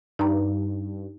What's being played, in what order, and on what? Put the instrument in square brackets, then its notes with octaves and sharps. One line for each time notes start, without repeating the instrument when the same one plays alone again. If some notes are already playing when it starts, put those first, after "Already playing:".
[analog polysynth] G2 [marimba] D#4 A#5